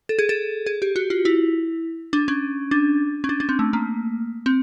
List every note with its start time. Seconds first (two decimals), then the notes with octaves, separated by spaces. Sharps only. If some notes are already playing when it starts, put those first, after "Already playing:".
0.09 A4
0.19 G#4
0.29 A4
0.66 G#4
0.82 G4
0.96 F#4
1.10 F4
1.25 E4
2.13 D4
2.28 C#4
2.71 D4
3.24 C#4
3.29 D4
3.40 D4
3.49 C4
3.59 A3
3.73 A#3
4.46 C4